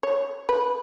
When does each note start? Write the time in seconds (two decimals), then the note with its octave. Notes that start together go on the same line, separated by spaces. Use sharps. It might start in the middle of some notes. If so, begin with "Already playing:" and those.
0.03 C#5
0.49 B4